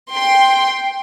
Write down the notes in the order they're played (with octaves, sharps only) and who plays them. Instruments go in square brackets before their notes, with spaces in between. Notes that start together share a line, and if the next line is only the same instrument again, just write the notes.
[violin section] G5 C6